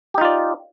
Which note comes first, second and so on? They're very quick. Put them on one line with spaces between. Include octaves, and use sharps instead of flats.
G4 D#4 F4 D5